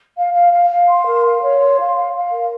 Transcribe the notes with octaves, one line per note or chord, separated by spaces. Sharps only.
F5
F5
F5
F5
C6
A#4
F5
C#5
C6
F5
F5
F5
A#4